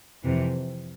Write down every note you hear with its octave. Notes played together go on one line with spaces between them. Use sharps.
F2 C3 E3